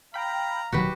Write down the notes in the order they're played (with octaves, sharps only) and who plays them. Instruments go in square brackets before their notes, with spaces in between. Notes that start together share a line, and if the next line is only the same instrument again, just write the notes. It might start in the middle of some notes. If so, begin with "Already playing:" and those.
[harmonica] F5 A#5 [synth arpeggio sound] G5 B5
[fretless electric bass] D1 D#3 F#3 [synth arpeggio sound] B2 [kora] F#4 G4 B4